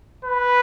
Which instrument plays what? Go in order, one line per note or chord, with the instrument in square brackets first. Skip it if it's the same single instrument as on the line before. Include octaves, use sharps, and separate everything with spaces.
[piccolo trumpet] B4